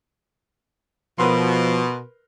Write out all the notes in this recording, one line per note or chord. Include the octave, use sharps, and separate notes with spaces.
B2 F3 A#4 B4 C6